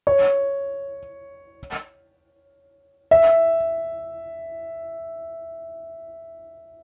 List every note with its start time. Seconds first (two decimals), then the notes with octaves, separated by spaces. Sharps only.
0.07 C#5
3.11 E5